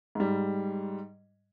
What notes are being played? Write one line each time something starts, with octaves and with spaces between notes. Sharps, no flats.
G#2 G3